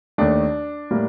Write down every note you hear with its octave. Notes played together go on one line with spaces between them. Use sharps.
D#2 D#3 A3 D4
A2 G3 A#3